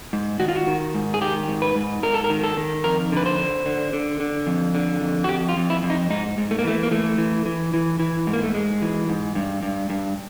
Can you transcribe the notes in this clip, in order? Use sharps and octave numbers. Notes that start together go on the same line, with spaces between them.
G#2
D#3 F#4
F4
F#4
D#3
G#2
G#4
D#3 G4
G#2
B4
G#2
G#2 A#4
A4
A#4
D#3
A4
D#3
F2 A#4
D3 B4
C5
D3
D3
D3
D3
F2
D3
F2
F#4
F2 G4
F4
F2
E4
F2
D#4
G#2 D#4
G#2
A3
A#3
E3 A3
A#3
E3 A3
E3
E3
E3
E3
G#2
A#3
A3
G#2 G#3
E3
G#2
G2
G2
G2